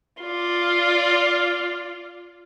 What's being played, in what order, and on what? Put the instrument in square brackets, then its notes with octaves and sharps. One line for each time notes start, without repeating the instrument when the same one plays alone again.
[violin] F4 D5